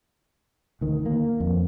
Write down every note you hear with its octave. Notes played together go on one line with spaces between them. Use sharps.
D2 D#3
A#3
F2